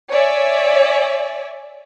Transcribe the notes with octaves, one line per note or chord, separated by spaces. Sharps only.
C#5 D5 E5 G#5